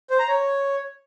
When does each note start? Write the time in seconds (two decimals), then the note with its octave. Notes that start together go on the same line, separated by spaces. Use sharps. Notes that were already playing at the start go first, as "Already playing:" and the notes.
0.10 C5
0.19 A#5
0.28 C#5